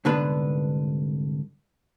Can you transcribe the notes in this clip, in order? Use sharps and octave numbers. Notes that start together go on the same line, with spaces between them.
C2 G#2 D3 B3 D4 B4